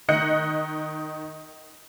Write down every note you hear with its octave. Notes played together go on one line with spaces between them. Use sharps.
D#3 D#5 F#6 G6 C#7